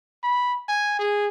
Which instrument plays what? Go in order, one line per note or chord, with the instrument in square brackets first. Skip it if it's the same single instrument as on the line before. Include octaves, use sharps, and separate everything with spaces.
[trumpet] B5
G#5
G#4